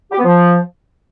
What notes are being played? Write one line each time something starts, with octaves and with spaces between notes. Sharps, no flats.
G4
B3
F3